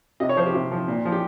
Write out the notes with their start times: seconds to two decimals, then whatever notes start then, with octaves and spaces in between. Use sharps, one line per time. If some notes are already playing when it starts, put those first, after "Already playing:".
0.20 C3 D#5
0.29 C#5
0.37 F3 C5
0.46 G4
0.54 C3
0.72 F3
0.88 A#2
1.05 F3
1.12 G4